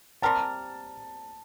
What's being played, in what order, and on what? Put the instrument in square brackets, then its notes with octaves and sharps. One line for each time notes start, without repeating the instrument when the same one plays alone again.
[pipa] G3 C4 G4 A#4 [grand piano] A5